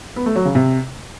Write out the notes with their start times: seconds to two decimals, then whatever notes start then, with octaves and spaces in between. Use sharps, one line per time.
0.16 B3
0.26 A3
0.36 F#3
0.45 C#3
0.55 C3